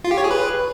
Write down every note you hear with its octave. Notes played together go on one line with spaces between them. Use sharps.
F4
G4
C#5
G#4
B4